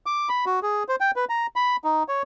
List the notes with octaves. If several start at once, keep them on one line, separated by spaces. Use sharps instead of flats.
D6
B5
F#4
G#4
C5
G5
B4
A#5
B5
D#4
C#5